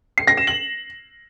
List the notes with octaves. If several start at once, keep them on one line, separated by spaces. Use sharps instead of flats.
C7
A#6
E7
F#7